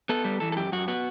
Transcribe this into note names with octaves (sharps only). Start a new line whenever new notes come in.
B3 A4
G3
E3 A4
A4
F#2 G4
F#2 F#4
B3 F#4